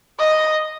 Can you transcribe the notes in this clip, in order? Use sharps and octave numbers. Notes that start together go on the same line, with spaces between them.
D#5